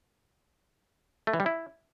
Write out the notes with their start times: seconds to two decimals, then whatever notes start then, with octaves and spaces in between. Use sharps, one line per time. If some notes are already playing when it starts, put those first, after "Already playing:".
1.27 A3
1.34 E3
1.40 G3
1.46 E4